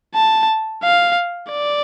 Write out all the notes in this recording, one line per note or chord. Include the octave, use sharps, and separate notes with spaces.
A5
F5
D5